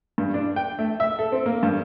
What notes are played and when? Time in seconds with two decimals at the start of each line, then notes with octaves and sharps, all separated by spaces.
0.18 G2
0.34 D4
0.56 G5
0.79 A3
1.00 E5
1.19 A4
1.32 C4
1.46 A#3
1.63 G2